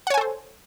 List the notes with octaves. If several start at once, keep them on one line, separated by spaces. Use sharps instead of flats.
A4 C5 C#5 F#5 G#5